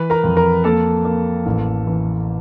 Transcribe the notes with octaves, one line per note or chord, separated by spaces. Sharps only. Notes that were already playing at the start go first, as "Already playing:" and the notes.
Already playing: E3 B4 B5
A#4 A#5
F2
A#4 A#5
A#3 A4 A5
A#3
A1
E3